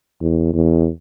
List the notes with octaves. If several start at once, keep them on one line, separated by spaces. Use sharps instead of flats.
E2
E2